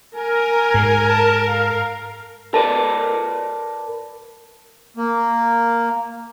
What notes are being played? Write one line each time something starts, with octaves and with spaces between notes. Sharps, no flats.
A#4 G#5
G#2
A5
F5
A#4 B4 D5 A5
A#3